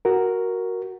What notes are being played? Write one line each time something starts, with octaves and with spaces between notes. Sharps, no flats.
F#4 A#4